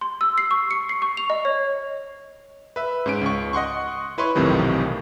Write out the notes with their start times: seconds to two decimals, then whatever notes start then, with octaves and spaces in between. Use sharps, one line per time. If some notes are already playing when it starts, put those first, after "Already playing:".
0.01 C6
0.21 E6
0.38 C7
0.51 C#6
0.71 C#7
0.89 C7
1.02 C#6
1.17 F7
1.30 D#5
1.45 C#5
2.76 B4 E5
3.06 G#2 C#4 D7
3.21 C#2 C#6
3.53 D#5 F#5 C6 C#6
4.18 E4 B4 C#5 C6 C#6
4.35 B1 F2 A2 C3 D#3 E3